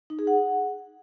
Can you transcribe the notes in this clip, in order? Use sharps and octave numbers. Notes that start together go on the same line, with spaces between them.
D#4
G#4
F#5